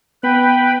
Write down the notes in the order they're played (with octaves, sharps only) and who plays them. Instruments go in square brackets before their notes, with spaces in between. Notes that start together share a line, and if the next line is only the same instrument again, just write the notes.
[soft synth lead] B3 [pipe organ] B4 G5 B5